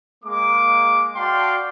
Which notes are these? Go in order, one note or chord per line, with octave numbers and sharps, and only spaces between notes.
G#3 A#3 D6
F#4 D5 F5 G5 A5 C6